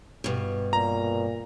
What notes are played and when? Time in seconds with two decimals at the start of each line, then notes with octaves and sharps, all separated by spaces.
0.24 G2 B2
0.73 A#2 A#5